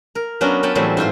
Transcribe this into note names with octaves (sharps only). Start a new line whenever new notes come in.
A#4
F#3 B3 C#4 D4 A#4
B3 C#4 G5 A5 B5
A2 E3 F#3 G3 C4
G#2 F4 C5 C6